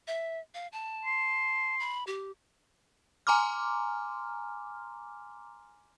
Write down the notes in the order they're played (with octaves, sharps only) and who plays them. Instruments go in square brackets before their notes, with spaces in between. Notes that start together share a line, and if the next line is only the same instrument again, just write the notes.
[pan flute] E5
F5
A5
[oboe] C6
[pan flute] B5
G4
[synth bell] G#5 A#5 C6 D6 F6